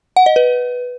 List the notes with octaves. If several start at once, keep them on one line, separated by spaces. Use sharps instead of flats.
F#5
D#5
B4